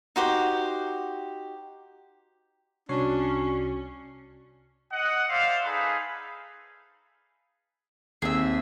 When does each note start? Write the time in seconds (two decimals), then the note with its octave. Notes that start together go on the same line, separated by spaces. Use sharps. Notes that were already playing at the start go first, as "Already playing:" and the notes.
0.16 D#4 F#4 G4 C5
2.89 C2 C#4 D4 F#4 C#5 C7
4.92 D#5 F#5
5.30 C5 D5 E5 F5
5.65 D#4 G#4 A4 B4 F5
8.22 D#2 C4 G#4 E5